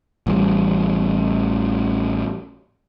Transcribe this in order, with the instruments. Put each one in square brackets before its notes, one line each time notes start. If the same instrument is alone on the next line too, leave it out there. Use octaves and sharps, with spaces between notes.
[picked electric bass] A1 E3 G3